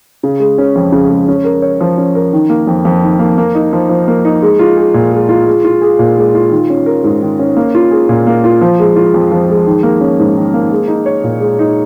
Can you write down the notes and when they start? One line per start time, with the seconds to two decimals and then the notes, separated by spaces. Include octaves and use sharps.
0.23 C#3
0.40 G#3
0.58 C#4
0.76 F2
0.92 C#3
1.10 G#3
1.28 C#4
1.44 A#4
1.62 C#5
1.81 F3
1.98 C#4
2.15 A#4
2.33 D#3
2.50 A#3
2.67 F2
2.85 F2
3.03 D#3
3.19 A#3
3.38 A#3
3.55 D#4
3.73 F3
3.89 F3
4.08 A#3
4.25 D#4
4.42 G#3
4.59 F4
4.77 G#4
4.94 A#2
5.12 G#3
5.29 F4
5.47 G#3
5.65 F4
5.81 G#4
5.99 A#2
6.17 G#3
6.35 F4
6.51 D#3
6.70 C#4
6.86 A#4
7.04 G#2
7.22 D#3
7.39 C#4
7.57 A#3
7.75 F4
7.91 G#4
8.09 A#2
8.27 A#3
8.44 F4
8.61 F3
8.79 G#3
8.96 F4
9.14 F2
9.32 F3
9.49 G#3
9.66 D#3
9.83 A#3
10.01 C#4
10.19 G#2
10.37 D#3
10.54 A#3
10.72 G#3
10.88 D#4
11.06 C#5
11.24 A#2
11.40 G#3
11.59 D#4